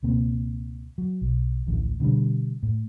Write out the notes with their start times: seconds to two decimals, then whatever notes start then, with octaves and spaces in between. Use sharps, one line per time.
0.03 C#2 B2 A#3 C4
0.98 F#3
1.22 B1
1.67 D1 A#1 A2 E3
2.00 B2 D3 F3 G3
2.63 A2